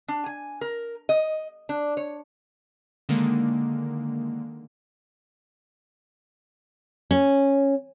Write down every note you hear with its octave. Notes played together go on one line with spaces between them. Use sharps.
D4
G#5
A#4
D#5
D4
C#5
D3 D#3 G#3 A#3
C#4